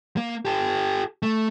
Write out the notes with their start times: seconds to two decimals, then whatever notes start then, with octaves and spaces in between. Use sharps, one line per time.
0.17 A#3
0.45 G4 A4
1.22 A3